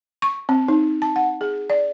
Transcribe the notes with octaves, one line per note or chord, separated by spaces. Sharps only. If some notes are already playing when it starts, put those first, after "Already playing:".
C#6
C4
D#4
A5
F#5
G#4
D5